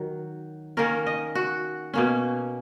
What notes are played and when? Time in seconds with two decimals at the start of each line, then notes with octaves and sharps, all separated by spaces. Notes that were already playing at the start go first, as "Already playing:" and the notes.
Already playing: D#3 F#3
0.77 D#3 A#3 C#4 A#4
1.07 D#5
1.35 F#4
1.94 B2 A#3 C#4